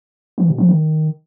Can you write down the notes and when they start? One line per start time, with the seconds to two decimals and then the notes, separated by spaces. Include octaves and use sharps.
0.38 E3
0.48 B2
0.58 F3
0.69 D#3